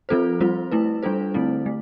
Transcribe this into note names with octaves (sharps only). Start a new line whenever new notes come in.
F3 C4 F4 A4 C5
G3 C4 F4 C5
A3 E4 B4
G3 D4 F4 A4 C5
D3 A3 C4 E4
A3